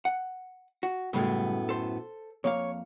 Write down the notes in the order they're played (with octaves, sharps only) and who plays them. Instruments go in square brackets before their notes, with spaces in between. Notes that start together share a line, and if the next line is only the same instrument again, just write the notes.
[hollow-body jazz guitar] F#5
F#4
[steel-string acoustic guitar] F#2 A2 B3 [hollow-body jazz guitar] C#3 G3 G#3
[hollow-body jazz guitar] A4 C5
[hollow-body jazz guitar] F2 A#3 F5 [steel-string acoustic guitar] C#5